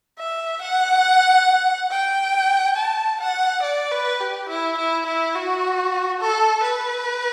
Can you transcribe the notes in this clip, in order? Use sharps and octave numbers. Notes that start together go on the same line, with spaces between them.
E5
F#5
G5
A5
F#5
D5
B4
G4
E4
E4
E4
F#4
A4
B4